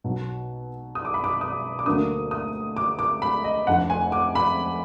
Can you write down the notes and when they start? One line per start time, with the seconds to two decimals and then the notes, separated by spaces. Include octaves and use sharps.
0.04 B1 B2 F#3
0.95 D#6
1.05 D6
1.14 B5
1.24 D6
1.41 D#6
1.79 D6
1.86 D2 D3 F#3 A#3 D4 D#6
2.31 D#6
2.77 D6
2.99 D6
3.22 B5
3.44 D#5
3.67 F1 F2 D3 F#5
3.90 G#5
4.12 D6
4.35 B5